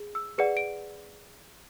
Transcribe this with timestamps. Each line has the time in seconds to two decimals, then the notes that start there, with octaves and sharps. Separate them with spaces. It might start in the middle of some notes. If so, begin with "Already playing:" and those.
Already playing: G#4
0.15 E6
0.38 G#4 B4 D5 F#5 C#7
0.57 D7